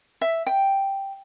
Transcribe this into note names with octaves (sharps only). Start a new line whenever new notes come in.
E5
G5